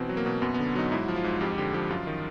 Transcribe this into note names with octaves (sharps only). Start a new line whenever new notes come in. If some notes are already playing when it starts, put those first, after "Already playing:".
Already playing: B2 E3 C4
F#3
A#3
B2
F#2 B3
B3
D3
F#3 D#4
G#2 E4
F3
F4
G#2
F2 G4
D3 G4
F3 G4
F#2 F4
D#3